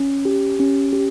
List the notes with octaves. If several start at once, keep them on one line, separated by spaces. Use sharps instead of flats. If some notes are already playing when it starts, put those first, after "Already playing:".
Already playing: C#4
G4
C#4
G4